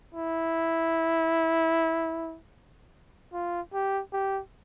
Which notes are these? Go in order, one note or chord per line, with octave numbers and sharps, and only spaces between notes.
E4
F4
G4
G4